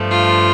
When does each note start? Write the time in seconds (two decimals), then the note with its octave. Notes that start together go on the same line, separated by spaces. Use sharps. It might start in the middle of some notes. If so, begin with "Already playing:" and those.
Already playing: G2 F3 A3
0.10 F4